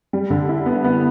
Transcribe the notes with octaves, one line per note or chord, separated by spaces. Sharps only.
G3
D3
E4
B3
B3